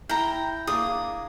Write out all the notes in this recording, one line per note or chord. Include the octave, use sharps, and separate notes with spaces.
E4 G5 A#5
A#3 D4 G#4 D#6